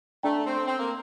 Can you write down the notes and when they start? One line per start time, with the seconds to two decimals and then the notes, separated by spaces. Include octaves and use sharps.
0.23 A3 D4 A4 D5 G5 A#5
0.45 C4
0.67 C4
0.78 A#3